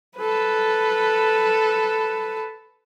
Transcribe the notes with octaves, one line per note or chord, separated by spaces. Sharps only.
A4 B4